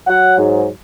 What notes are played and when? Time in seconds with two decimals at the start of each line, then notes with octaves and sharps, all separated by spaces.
0.07 F#3 F#5
0.38 G#2